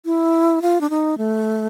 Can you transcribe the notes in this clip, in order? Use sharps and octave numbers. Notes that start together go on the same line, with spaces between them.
E4
F4
D4
D#4
A3